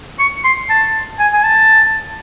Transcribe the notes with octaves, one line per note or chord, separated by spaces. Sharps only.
C#6
C6
A5
G#5
G#5
A5